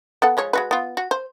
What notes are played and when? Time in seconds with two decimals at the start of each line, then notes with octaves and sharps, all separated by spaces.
0.22 B3 A4 F#5
0.37 F3 G#3 C#5
0.53 G#3 F#4 B4
0.71 B3 F4
0.97 F#4
1.11 C5